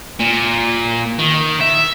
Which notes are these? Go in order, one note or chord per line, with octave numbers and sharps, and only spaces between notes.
A#2
D#3
E5